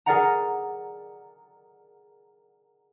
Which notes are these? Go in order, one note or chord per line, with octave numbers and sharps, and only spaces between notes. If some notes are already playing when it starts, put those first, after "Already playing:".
G#4 A#4 D5 D#5 F#5 A#5